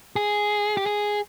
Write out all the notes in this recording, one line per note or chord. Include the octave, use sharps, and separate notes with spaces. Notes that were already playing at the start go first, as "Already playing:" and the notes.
G#4
G4
G#4